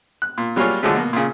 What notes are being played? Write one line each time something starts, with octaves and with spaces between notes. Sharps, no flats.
F#6
A#2
F#3 G3 A#3 F4 G#4 C#5
D3 F3 F#3 G#3 A3
B2 A#3
A#2 C#3